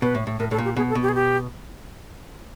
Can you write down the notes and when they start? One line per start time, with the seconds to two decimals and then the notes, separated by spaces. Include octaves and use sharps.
0.02 B2 B4
0.15 A2
0.27 A2
0.39 A2 A#4
0.51 A2 A4
0.58 A#2
0.65 G4
0.77 B2 G#4
0.90 A4
0.95 B2
1.03 G4
1.09 G#4
1.15 G4